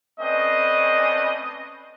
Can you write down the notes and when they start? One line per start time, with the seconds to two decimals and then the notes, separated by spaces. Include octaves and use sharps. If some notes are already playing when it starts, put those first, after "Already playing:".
0.20 A3 C4 C#4 B4 D5 D#5